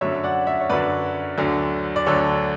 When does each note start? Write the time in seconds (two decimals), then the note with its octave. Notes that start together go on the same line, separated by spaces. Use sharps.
0.01 F#2 D3 F#3 C#5 E5
0.24 D5 F#5
0.47 C#5 E5
0.61 C#5
0.69 F#2 D3 F#3 B4 D5
1.38 D2 D3 F#3
1.96 D5
2.06 D2 D3 F#3 A4 C#5